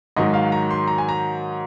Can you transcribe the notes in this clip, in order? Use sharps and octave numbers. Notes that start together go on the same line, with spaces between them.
G#2 D#3 F#3 D#5
F5
A#5
C6
A#5
G#5
A#5